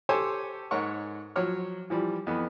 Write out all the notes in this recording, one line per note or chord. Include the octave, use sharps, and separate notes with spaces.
G4 A4 C5 C#5 G#5
G#2 A#4 C#5 F#5 C#6
F3 F#3 F#4 C#5 F6
E3 F3 G3
F2 E3 B3